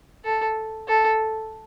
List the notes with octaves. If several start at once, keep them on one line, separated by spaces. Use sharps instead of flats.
A4
A4